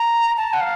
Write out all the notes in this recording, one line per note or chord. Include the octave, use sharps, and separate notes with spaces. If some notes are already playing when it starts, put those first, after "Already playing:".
Already playing: A#5
A5
F#5
F5